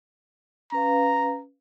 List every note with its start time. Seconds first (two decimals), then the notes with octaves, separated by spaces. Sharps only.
0.72 C#4 B4 F5 A#5